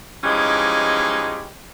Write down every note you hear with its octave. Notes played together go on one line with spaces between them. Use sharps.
E3 F3 G3 G#3 C#4 D#4